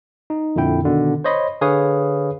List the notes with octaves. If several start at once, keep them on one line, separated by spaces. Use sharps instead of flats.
D#4
F2 A#2 D3 E4 G5
B2 D3 D#3
C5 C#5 D#5 B5 C6
D3 G#4 B4 C#5 F5 D#6